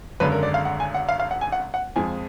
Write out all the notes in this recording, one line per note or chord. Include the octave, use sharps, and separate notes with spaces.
G#1 F#2 D3 G#3 B4
A#4
D5
F5
F#5
G#5
F#5
F5
F5
F#5
G#5
F#5
F#5
F2 F3 G#3 G#5